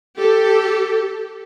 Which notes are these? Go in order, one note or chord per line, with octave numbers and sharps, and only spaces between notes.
G4 A4